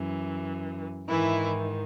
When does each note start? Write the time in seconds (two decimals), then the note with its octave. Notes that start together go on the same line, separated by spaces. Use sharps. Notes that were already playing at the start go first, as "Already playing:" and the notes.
Already playing: F#2 E3
1.08 G#2 D#3 E3 E4